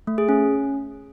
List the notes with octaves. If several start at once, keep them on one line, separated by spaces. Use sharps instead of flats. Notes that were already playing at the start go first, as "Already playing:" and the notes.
A3
G#4
C#4